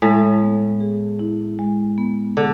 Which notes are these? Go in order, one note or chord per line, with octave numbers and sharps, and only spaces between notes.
A2 G#3
B3
G#4
E4
G#3
B3
D3 G#4